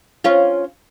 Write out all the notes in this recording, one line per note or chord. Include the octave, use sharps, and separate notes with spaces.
C#4 F4